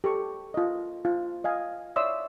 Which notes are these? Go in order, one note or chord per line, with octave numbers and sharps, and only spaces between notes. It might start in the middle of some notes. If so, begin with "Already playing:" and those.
G4 A4 C#6
F4 D#5
F4
D#5 F5 G#5
C#5 D5 E5 C6 D#6 E6